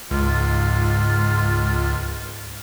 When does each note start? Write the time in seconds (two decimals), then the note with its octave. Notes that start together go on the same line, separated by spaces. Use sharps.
0.11 C#2 G#2 F4